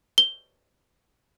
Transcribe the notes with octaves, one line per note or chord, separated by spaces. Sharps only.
G7